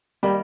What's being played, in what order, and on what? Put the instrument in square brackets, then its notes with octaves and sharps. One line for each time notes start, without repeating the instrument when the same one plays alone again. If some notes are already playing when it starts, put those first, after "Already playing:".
[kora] D#3 A#3 [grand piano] G3